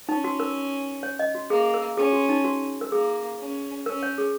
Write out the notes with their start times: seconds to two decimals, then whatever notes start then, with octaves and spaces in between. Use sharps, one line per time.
0.08 C#4 D#4
0.24 F#4
0.40 A#4
1.03 C#5
1.19 D#5
1.35 F#4
1.50 A#3 G#4
1.74 A#4
1.97 C#4 G#4
2.13 F#4
2.29 D#4
2.44 F#4
2.81 A#4
2.91 A#3 G#4
3.39 C#4
3.86 C#4 A#4
4.02 C#5
4.18 G#4